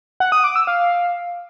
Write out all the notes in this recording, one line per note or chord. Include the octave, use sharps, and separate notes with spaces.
F#5
D#6
D6
E6
F5